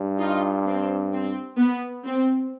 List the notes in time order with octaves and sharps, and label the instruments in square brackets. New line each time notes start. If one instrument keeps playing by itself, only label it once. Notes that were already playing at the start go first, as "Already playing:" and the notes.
Already playing: [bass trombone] G2
[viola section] D#4 F4
C4
C4
B3
C4